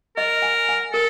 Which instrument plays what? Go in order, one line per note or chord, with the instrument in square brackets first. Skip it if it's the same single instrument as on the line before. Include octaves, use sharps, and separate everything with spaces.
[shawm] A#4 [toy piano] D#5
[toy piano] G#5
G#5
[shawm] A4 [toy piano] A#4